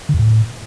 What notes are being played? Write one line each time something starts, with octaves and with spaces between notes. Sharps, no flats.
D3
F2
A2